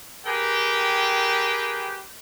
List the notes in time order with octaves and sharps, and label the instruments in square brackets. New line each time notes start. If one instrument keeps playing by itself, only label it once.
[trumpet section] G4 G#4 A#4 B4 G5